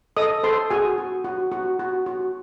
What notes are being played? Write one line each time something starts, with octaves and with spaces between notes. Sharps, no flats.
A4 D#5 D#6
A4 C5 C6
F#4 G#4 G#5
F#4
F#4
F#4
F#4
F#4